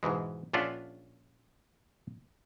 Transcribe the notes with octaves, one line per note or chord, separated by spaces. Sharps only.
G#2 B2 E3 G#3
A#1 C#4 D4 F4 E5 F#5